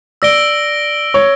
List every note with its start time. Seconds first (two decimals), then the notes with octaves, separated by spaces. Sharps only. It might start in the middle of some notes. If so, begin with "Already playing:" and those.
0.22 D5 E6 A#6 D7 G7
1.14 C#5